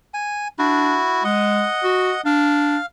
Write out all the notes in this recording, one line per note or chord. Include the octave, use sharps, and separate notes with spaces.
G#5
D4 E4 F#4
G#3 D#5 F#5
F#4
D4 F5